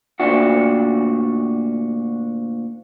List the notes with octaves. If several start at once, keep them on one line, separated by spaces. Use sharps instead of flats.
D2 A#2 D4 F#4